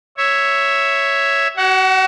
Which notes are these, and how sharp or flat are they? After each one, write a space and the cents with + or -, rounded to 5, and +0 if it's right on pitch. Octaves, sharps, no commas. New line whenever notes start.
C#5 +0 E5 +0
F#4 +35 F#5 +0